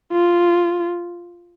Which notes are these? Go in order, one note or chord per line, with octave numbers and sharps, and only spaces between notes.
F4